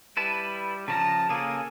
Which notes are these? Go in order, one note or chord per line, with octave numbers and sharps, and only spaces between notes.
G3 E4 B4 A5
C#3 F3 A5 A#5
C#3 A#3 G#4 A4